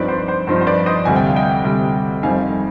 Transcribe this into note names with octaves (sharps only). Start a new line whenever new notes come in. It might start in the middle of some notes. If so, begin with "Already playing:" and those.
Already playing: G2 F3 C4 D#4 B4 D5
C5
C5
G2 F3 C4 D#4 C5
C5
B4 D5
C5 D#5
D2 C3 G3 G#5
G5
F5
D#5 G5
D2 C3 G3
F2 D#3 G3 C4 D#4 F5 G#5